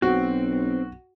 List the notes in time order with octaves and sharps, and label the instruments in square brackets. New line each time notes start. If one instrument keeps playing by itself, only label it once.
[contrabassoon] B1 [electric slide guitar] C4 [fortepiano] F#4